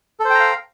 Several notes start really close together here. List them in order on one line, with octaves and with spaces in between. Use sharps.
A4 C5 G5 A#5 F5